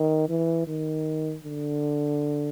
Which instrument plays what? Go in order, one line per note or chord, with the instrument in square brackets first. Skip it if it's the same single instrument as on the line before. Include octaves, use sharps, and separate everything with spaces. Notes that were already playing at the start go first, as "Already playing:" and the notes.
Already playing: [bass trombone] D#3
E3
D#3
D3